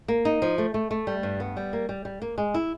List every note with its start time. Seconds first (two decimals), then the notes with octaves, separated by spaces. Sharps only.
0.08 A#3
0.25 D#4
0.42 F3
0.58 A3
0.74 A3
0.91 A3
1.07 G3
1.23 G2
1.40 B3
1.57 G3
1.73 A#3
1.89 G3
2.05 G3
2.22 A#3
2.38 G#3
2.54 E4